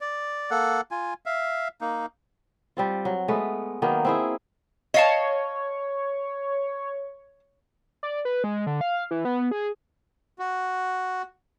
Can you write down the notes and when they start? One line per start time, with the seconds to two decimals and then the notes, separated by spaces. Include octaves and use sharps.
0.01 D5
0.51 A#3 A4 F#5
0.91 F4 G#5
1.26 E5 F5
1.81 A#3 D#4
2.77 G3 C4 F4
3.05 F#3
3.28 G#3 A3 B3
3.82 D#3 F#3 A#3 B3
4.05 C4 E4 G#4
4.94 C#5 D#5 F5 A5
8.03 D5
8.25 B4
8.44 G#3
8.67 D3
8.81 F5
9.11 E3
9.25 B3
9.51 G#4
10.39 F#4